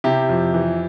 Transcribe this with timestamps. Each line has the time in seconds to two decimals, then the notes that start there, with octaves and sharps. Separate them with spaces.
0.04 C3 E4 G4
0.29 F2
0.54 E3